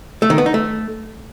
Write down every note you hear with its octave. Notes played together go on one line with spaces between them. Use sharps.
A3
D#3
B3
D#4
A3